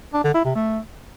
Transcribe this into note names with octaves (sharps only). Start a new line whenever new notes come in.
D4
D3
E4
C3
A3